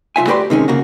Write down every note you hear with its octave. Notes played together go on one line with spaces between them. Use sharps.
C2 F4 E5 G#5
A3 F#4 G4 B4 D5 C6
C3 D#3 G#3 C#4
C#3 A#3 F#4